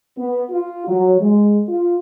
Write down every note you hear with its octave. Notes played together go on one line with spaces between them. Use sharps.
B3
F4
F#3
G#3
F4